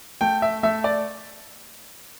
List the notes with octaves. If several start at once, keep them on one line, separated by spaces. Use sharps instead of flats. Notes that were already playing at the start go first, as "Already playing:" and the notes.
A3 G5
E5
A3 E5
D5